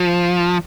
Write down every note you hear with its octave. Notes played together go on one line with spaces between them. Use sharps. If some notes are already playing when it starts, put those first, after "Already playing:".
Already playing: F3